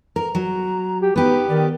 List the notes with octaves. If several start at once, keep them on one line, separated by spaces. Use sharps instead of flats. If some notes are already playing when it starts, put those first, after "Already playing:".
A#4 A#5
F#3
G4
B3 D#4 G4 B4
D#3 D5